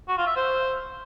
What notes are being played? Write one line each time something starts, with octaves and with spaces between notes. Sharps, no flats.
F#4
F4
E5
C5